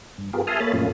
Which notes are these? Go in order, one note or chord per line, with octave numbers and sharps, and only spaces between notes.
G2
B3 F4 G4 G#4 A#4
E5 G#5 A5 C6 D#6 F6
A#3 A4 C#5 B5 A6
F#2 A#2 A3 C#4 F4